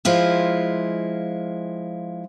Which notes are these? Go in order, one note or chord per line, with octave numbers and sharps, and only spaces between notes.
F3 G#3 E4 F4